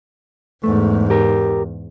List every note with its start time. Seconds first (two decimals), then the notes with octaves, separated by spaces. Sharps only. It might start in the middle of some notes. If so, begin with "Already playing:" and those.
0.64 E2 G#2 A3
1.10 G4 A#4